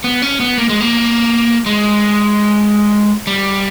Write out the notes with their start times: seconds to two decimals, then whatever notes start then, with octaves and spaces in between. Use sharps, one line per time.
0.04 B3
0.22 C#4
0.40 B3
0.58 A#3
0.69 G#3
0.81 A#3
1.66 G#3
3.27 G3